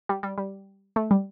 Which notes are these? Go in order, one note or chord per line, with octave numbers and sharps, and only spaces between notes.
G3
G3
G3
A3
G3